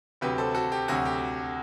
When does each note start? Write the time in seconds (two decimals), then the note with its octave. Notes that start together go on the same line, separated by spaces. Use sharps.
0.21 D2 C3 F#3 G4 B4
0.38 A4 C5
0.54 F#4 A4
0.72 G4
0.88 D2 C3 F#3 F#4
1.05 G4